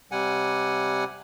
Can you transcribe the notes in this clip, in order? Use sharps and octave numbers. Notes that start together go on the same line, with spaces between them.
C3 G3 F#5 G#5